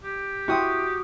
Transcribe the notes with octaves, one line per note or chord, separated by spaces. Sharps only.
G4
E4 F#4 G5 C6 D#6